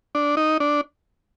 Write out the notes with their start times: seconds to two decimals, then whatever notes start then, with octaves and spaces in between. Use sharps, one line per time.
0.15 D4
0.37 D#4
0.60 D4